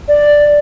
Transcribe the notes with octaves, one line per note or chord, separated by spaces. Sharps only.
D5